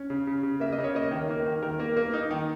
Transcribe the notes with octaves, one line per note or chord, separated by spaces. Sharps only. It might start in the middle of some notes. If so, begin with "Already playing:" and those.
Already playing: C#4
C#3
C#3
C#3
A#3 E5
D#5
C#3
C#5
A#3 D#5
D#3
A#3
D#3
D#3 A#4
A#3
A#3
D#4
D#3